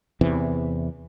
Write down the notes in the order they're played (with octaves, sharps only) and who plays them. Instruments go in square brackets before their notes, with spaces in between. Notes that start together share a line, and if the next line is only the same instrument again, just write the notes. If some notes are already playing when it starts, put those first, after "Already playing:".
[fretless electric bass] E2 C3 E3